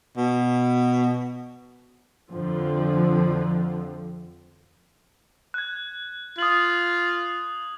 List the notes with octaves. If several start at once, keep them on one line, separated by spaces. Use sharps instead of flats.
B2
F2 D3 F3
F#6 G#6
F4 D#6 F#7